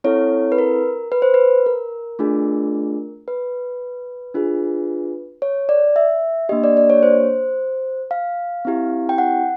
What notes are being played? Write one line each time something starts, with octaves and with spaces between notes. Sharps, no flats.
C4 E4 A4 C#5
B4
A#4
B4
C5
B4
A#4
A3 D4 F4 G#4
B4
D4 F4 G#4
C#5
D5
E5
A#3 D4 G4 D#5
D5
D5
C#5
C5
F5
C4 E4 G4
G5
F#5